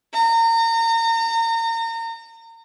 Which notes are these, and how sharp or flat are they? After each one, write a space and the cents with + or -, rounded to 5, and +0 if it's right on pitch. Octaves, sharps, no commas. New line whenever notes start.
A#5 -30